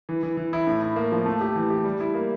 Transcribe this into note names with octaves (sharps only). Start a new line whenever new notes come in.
E3
E3
E3
E4
A2
E4
A#3
F3
A3
G4
E3
G4
G3
E4
A#3